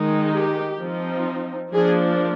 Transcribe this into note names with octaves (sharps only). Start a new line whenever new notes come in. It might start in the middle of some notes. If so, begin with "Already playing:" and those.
Already playing: D#3 G#3 D#4
G4
F3 C4 D#4
F3 A#3 D4 G#4